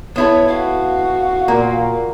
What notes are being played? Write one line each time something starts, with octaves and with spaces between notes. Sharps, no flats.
B3 E4 A4 C#5
F#4 F5
A#2 A#3